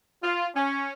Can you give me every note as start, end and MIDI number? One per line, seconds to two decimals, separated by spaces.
0.22 0.47 65
0.54 0.92 61